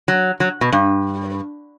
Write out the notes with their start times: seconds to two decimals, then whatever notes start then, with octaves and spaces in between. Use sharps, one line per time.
0.08 F#3
0.40 F#3
0.61 B2
0.72 G2